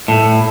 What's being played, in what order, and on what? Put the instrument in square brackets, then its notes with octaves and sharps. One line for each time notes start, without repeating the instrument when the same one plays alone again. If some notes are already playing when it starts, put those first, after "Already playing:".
[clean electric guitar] A2